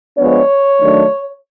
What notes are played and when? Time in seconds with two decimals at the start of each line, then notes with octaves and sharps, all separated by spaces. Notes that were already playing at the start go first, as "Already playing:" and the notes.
0.17 F3 G#3 B3 D4 C#5
0.81 D#3 F#3 A3 D4